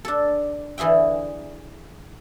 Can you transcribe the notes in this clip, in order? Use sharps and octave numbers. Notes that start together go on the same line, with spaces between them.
D4 A4
D3 E3 G#4 E5 G5